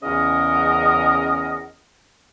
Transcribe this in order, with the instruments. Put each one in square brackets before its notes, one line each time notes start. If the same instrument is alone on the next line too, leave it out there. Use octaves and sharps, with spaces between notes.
[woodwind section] E2 C#3 C#4 A#4 D#5 F#5